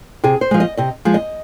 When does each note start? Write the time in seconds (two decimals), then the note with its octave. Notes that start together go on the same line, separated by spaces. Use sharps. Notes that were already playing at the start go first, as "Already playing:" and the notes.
0.24 C3 G#4
0.41 C5
0.51 F3 G#3
0.60 D#5
0.77 C3 D#5
1.05 F3 G#3
1.14 D#5